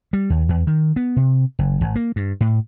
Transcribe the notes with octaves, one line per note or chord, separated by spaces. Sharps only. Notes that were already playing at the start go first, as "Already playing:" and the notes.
G3
D#2
E2
D#3
B3
C3
F#1
G#1
A#3
G2
A2